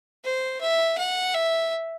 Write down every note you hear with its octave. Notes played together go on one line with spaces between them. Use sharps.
C5
E5
F#5
E5